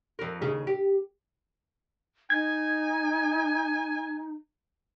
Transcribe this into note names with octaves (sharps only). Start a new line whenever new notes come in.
F2 A#4
D#2 C#3 G#4
G4
D#4 G#5 G#6